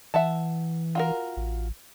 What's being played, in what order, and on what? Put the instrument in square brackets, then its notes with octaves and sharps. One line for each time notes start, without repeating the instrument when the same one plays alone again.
[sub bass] E3 [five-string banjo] E5 F#5 A5
[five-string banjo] F4 F#4 A#4
[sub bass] A1